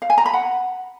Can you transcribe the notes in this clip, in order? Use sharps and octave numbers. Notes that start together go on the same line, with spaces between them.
F5
G#5
A#5
B5
F#5